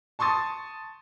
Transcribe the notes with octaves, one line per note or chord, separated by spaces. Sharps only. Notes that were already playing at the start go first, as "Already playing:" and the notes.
A5 C6 C#6 D#6 A6